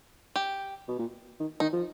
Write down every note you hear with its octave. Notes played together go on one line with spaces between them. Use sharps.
G4
B2
A#2
D#3
D#3 D#4
F3